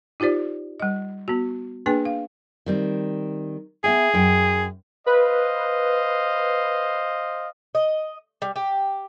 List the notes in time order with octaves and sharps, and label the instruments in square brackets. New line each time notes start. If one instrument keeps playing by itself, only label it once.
[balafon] D#4 F4 G4 C5 D5
G3 D#5
B3 F#4
A#3 D4 G#4 B4 G5 G#5
F5
[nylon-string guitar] D#3 G3 C4
[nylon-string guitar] B3 E5 G5 [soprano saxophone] G#4
[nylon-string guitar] F#2 G5
[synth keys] B4 [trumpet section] C5 D#5 F5
[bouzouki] D#5
G3
G4